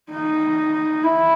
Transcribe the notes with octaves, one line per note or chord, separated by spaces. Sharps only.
D#4
E4